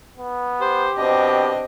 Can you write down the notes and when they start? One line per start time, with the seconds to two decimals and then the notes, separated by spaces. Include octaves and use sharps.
0.18 B3
0.61 G4 C5
0.97 B2 C4 D4 D#5